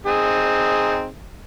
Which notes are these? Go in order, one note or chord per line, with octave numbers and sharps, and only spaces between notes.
C4 D#4 G#4